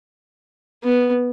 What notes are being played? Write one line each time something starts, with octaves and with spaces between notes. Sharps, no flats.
B3